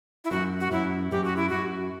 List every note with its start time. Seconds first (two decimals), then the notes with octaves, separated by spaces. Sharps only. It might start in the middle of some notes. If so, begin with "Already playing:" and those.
0.24 E4
0.31 F#2 F#4
0.60 F#4
0.72 F#2 E4
1.11 F#2 G4
1.24 F#4
1.36 E4
1.49 F#2 F#4